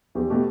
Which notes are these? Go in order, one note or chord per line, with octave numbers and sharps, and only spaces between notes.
E2 G4
B2 A3 G4